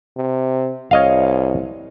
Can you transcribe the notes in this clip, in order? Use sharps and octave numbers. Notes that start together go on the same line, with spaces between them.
C3
C2 C#5 D#5 F5